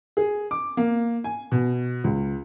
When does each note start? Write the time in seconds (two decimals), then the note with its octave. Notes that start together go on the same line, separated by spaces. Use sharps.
0.17 G#4
0.51 D6
0.77 A#3
1.24 G#5
1.52 B2
2.04 C#2